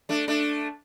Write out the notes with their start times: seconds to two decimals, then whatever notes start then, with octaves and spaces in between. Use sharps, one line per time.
0.09 A3 D4
0.28 A3 D4